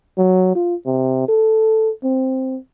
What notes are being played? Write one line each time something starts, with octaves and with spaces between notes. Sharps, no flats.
F#3
F4
C3
A4
C4